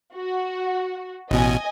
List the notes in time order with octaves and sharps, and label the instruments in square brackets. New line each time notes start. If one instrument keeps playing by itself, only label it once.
[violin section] F#4
[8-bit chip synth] A1 B2 [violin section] D#5 G#5